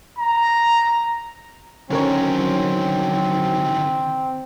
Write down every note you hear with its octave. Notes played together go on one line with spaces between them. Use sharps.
A#5
D3 D#3 F#3 C4 C#4 A#4 C#5